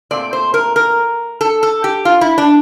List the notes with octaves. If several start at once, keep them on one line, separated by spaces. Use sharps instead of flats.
A#2 A3 C4 D5
C5
A#4
A#4
A4
A4
G4
F4
E4
D4